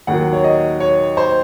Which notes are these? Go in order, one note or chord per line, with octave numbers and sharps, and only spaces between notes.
D#2 D#3 F#3 F#5
C#5
D#5
C#5
C5